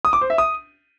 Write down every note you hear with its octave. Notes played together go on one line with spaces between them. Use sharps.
D#6
D6
C5
E5
D#6